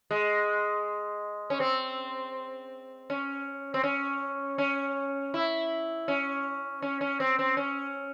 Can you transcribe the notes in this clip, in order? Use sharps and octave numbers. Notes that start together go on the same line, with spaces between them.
G#3
C#4
C4
C#4
C4
C#4
C#4
E4
C#4
C#4
C#4
C4
C4
C#4